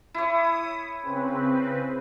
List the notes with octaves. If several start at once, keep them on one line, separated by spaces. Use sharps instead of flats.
E4 C#5 D#6
C#3 C4 B4